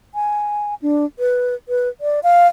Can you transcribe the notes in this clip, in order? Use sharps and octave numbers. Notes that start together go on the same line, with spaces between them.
G#5
D4
B4
B4
D5
F5